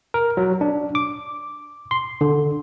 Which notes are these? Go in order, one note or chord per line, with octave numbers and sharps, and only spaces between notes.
A#4
F#3
D4
D6
C6
D3